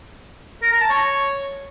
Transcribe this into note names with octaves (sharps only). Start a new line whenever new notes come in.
A#4
A#5
A5
C#5